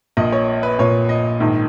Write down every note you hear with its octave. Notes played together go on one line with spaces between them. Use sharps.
A#1 A#2 D#5
C#5
B4
A#1 A#2 C#5
D#5
A#1 G#2 D#3